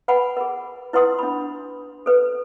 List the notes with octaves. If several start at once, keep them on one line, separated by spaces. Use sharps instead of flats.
B4 F#5 G#5 B5
G#4 A#4
E4 B4 F#5 C6 D#6
D4 B5
A4 B4